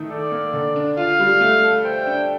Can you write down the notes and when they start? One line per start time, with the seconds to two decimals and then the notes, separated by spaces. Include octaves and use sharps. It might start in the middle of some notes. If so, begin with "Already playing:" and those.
Already playing: D#3 A3 D#4
0.10 A4 D5
0.32 A#3
0.53 D3
0.76 D4
0.97 F4 F5
1.20 G3
1.40 A3
1.63 A4
1.85 C5 G5
2.06 D4